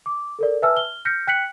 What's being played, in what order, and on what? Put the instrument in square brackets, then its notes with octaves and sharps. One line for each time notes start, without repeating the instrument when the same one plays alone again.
[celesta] D6
A4 A#4 D5
B4 E5 G#5 A5 E6 F6
F6 G7
F6 G6 A#6 B6 C#7
G5 F#6 B6 C#7 F#7